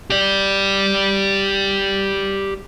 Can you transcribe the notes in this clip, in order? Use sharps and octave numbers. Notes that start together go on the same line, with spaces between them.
G4 D5